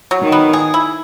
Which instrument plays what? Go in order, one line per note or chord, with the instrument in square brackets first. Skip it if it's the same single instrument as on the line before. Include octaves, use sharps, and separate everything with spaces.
[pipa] F#3
[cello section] D#3
[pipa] B3
G#4
E4